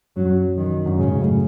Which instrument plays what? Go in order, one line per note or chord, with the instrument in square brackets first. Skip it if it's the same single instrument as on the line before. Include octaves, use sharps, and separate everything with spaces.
[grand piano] F#2 [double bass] F#3
[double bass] D#3
[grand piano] F#2
[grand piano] G#2 [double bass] C#3
[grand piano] G#2
F#2 A2